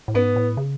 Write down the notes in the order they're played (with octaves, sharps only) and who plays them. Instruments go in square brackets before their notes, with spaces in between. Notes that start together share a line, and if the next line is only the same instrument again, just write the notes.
[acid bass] A2
[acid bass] G#2 [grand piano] B3
[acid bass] A2
C#3